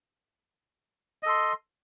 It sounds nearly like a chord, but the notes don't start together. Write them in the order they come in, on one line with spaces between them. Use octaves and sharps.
D#5 A4 C6